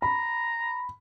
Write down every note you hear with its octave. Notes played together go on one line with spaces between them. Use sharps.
A#5 B5